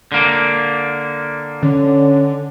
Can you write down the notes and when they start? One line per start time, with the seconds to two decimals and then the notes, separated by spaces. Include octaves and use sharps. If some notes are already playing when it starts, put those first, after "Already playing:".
0.12 D3 A#3
1.62 D3 C#4